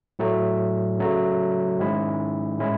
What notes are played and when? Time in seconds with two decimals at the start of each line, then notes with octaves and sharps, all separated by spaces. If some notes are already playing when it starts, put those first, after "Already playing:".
0.19 A2 F#3 A3
0.99 C#3 F#3 A3
1.79 G#2 D#3 G#3 C#4 E4
2.59 A2 G#3 C#4 E4